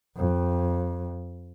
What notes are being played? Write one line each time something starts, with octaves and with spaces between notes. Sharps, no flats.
F2